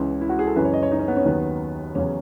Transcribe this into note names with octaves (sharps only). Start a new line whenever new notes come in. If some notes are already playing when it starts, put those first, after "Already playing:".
Already playing: C#2 C#3 E3
E4
F#4
G#4
A4
F#2 C#3 E3 B4
C#5
D#5
C#5
D#4
C#4
B3
C#4
D#2 D#3 F#3 B3
E2 C#3 F#3 C#4